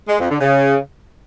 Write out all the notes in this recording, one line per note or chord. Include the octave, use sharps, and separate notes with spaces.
G#3
F2
D3
C#3